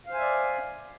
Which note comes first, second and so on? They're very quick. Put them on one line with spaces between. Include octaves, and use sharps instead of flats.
F5 C5 G#5 E5 D5